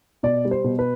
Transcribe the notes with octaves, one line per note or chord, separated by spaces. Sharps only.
B2 D5
G3
C5
B2
B4